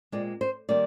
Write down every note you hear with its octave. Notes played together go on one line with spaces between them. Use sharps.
A#2 G#3 C4 D5
C5
D#3 G3 A#3 D5